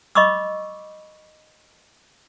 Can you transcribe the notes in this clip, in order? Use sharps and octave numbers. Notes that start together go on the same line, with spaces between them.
D#5 B5 C#6 D6 E6